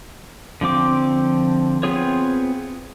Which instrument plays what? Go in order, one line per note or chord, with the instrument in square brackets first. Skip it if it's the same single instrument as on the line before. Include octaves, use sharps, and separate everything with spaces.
[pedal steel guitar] D3 F3 C4 D6
B3 C4 F4 G#4 C#5